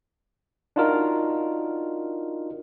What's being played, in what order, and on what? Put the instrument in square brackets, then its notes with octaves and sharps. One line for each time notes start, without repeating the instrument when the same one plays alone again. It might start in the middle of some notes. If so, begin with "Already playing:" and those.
[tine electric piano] D4 D#4 F4 F#4 A#4 D#5